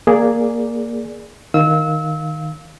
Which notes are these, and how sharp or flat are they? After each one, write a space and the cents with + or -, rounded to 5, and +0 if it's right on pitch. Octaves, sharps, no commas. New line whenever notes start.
A#3 +0 G#4 +0 D5 -5
D#3 +0 F5 +0 E6 -30